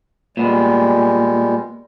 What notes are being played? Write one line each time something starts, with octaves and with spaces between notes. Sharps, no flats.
A#2 G3 G#3 B3